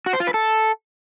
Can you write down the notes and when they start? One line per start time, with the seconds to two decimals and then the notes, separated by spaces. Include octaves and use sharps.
0.06 F#4
0.13 C5
0.20 F4
0.27 B4
0.34 A4